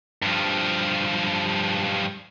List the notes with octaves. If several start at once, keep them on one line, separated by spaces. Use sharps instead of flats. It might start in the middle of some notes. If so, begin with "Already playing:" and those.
G2 F3